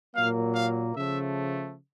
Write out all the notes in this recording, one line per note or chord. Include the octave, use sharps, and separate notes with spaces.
A#2 F#3 A#3 F5
F5
C#3 F3 A3 E5